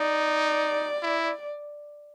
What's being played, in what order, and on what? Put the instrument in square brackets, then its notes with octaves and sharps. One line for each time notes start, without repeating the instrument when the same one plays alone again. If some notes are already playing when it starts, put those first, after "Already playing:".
Already playing: [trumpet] D#4 [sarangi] D5
[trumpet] E4